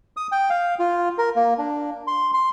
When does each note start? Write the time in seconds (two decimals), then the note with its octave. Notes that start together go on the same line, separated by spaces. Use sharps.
0.17 D#6
0.32 G5
0.50 F5
0.79 F4
1.18 A#4
1.36 A#3
1.58 D4
2.07 C6
2.34 C6